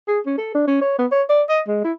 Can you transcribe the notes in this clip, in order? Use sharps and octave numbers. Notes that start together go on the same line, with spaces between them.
G#4
C#4
A4
D4
C#4
C#5
B3
C#5
D5
D#5
G#3
E4